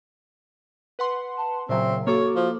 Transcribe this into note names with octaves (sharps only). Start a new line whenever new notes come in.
B4 F#5 C6
A5
A#2 C#3 F#3 C4 E5
A#3 F#4 A4 C#5 D6
F3